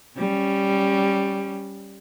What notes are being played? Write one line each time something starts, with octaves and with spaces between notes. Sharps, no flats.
G3 C#4